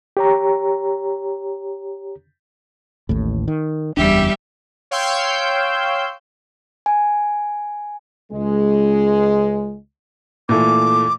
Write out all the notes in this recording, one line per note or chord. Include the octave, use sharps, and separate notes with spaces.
G4 C#5 A#5
A1 D#2 A2
D#3
F#1 E2 G3 D4 G4 E5
C#5 F5 G5 C6 E6 G6
G#5
C#2 G#3
A#2 E3 A3 D6